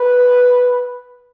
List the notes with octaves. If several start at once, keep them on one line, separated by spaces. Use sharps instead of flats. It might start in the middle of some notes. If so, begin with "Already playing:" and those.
Already playing: B4